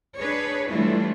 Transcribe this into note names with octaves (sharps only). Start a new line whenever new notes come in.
D4 G#4 B4 C#5
E3 G3 A3 D4 E4 F4